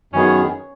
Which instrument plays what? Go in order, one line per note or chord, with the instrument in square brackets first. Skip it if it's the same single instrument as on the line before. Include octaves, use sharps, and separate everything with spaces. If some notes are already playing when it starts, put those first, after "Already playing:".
[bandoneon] F#2 D#3 B3 G#4 [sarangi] C#4